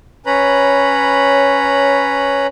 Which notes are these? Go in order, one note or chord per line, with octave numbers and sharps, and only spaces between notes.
C#4 B4 C#5 A#5 B5